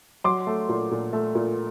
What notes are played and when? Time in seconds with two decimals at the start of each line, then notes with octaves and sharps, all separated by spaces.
0.24 F#3 C6 D6
0.47 A3
0.69 A#2
0.91 A#2
1.13 A3
1.35 A#2